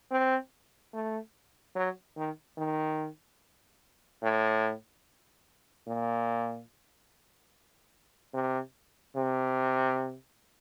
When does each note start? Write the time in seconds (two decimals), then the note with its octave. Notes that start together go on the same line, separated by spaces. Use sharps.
0.11 C4
0.94 A3
1.76 F#3
2.17 D#3
2.58 D#3
4.23 A2
5.87 A#2
8.34 C3
9.16 C3